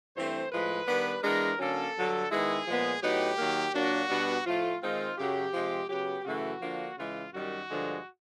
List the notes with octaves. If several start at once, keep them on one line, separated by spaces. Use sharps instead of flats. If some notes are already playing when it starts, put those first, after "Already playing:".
G2 E3 A3 C4 C5
A2 F3 G#3 B4
D#3 G3 B3 D4
E3 G#3 B3 D4 A#4
D3 F#3 A#3 C#4 A4
G2 D3 F#3
D#3 G#3 B3 E4 G#4
A#2 F3 G#3 B3
A2 F#3 B3 D#4 G4
D#3 F#3 A#3
A#2 F#3 A#3 D4 F#4
B2 G3 B3 D4
A2 F3 A3 F4
D#3 G#3 C4 D#4 F4
F#2 C#3 F#3 G4
C3 F3 G#3
C#3 F#3 B3 G4
F#2 C#3 E3 A3 F#4
D3 F3 A#3 D4
C#3 E3 G#3 F4
F#2 D#3 G3 F#4
G2 D3 F3 G#3